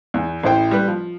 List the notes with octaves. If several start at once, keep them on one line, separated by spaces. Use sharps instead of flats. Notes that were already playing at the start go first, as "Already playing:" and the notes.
E2
A1 E4 C5 G5
G3 B4
F3